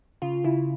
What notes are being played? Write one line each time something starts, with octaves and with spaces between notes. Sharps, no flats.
C#3 F4
C#3 E4